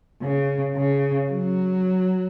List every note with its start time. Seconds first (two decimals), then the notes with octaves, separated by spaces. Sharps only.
0.22 C#3
0.76 C#3
1.31 F#3